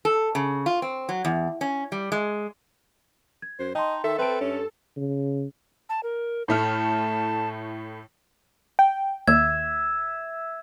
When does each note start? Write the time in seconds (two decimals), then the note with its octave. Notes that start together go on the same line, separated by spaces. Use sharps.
0.05 A4
0.35 C#3
0.66 F4
0.82 C4
1.09 F#3
1.25 E2
1.61 C#4
1.92 G3
2.12 G#3
3.42 G#6
3.59 F#2 C5
3.75 D#4 D#5 G5 A5 C6
4.04 D#3 A4 E5
4.18 C4 B4 E5 A5 D7
4.41 G2 C#4
4.97 C#3
5.89 A5
6.03 A#4
6.48 A2 A3 A5 F6
8.79 G5
9.28 D#2 E5 G#6